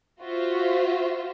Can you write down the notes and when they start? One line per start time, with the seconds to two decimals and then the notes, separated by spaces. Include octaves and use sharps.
0.21 F4 F#4 C5 E5